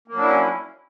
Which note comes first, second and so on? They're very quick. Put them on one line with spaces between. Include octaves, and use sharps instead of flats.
A#3 F#3 D4 E4 C#4